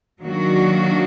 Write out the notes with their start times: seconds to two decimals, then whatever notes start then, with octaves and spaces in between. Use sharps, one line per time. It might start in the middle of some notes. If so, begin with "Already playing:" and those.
0.22 D#3 F#3 A#3 D4 F#4